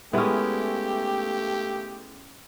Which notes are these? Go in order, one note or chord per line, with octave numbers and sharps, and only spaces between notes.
G#3 A3 B3 C#4 E4 G4